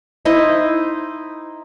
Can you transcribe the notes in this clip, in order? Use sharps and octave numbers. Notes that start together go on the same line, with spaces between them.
D#4 E4 C5 D#5